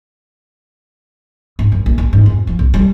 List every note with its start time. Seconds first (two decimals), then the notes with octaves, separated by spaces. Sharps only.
1.59 G#2
1.72 F#2
1.86 A#1
1.98 D#2
2.13 G#2
2.26 F2
2.47 F3
2.59 B1
2.74 G3